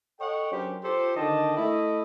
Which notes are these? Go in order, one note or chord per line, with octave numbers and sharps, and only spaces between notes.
A4 C#5 D#5 F#5 G5
F#3 C#4 D4 G4 A#4 C5
F4 G4 A4 C5
D3 D#3 D4 D#5 G5 A5
A3 E4 D#5